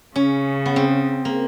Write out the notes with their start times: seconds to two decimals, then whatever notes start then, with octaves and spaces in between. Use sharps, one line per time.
0.16 C#3 C#4
0.66 B3
0.76 C4
1.25 A#3